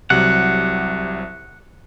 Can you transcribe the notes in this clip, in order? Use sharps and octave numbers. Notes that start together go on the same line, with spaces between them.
C2 C3 F#3 F#5